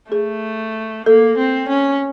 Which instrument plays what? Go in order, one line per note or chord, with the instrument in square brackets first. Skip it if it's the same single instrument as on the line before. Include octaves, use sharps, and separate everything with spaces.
[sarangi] A3 [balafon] G#4
[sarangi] A#3 [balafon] A4
[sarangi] C4
C#4